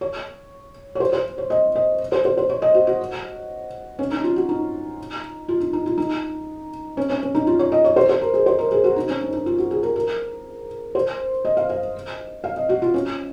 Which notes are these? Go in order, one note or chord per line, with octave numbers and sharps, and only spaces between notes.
C#5
C#5
C5
C5
C#5
D#5
D#5
C5
C5
C5
C#5
D#5
F#4
F#4
C#4
D#4
F4
F#4
D#4
F4
D#4
D#4
F4
D#4
C#4
C#4
C#4
D#4
F4
C#5
D#5
C#5
C5
C5
A#4
G#4
C5
A#4
G#4
F#4
D#4
C#4
D#4
D#4
F4
F#4
G#4
A#4
A#4
C5
D#5
F5
F5
F5
D#5
F#4
F4
C#4